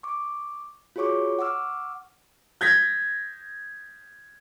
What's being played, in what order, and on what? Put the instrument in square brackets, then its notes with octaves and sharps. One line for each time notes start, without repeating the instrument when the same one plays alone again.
[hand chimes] C#6 D6
F4 F#4 G#4 C#5 C#6 D6
F#5 C#6 D6 E6 F6
[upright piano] G6 G#6 A#6 B6